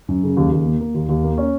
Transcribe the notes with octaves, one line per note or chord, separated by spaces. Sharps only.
F#2
C#3
D#2
D#2
A#3
A#3
D#2
D#2
A#3
C#4